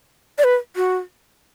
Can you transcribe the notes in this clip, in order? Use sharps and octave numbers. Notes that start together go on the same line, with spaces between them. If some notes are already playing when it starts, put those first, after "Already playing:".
D5
B4
F#4